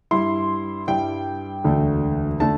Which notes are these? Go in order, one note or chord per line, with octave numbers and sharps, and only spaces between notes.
G2 G3 E4 C6
G2 G3 E4 G5
E1 D2 D3 A3
D3 A3 A5